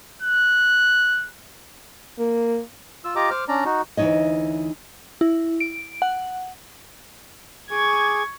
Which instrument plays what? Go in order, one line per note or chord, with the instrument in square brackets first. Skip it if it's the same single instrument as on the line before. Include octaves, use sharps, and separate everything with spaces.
[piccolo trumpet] F#6
[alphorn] A#3
[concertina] F4 E6
F4 G4 D#5 A#5 D6
C5 D6 F6
C#4 D4 D5 A#5
D#4 F#4
[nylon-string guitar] D2 E3 A3 D#4 C#5 D#5
[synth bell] E4
D7
F#5
[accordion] G#4 G#5 D6 [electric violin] C#6 G#6